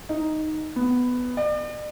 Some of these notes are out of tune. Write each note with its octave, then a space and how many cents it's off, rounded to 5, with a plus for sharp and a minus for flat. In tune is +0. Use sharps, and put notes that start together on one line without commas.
D#4 +0
B3 +10
D5 +40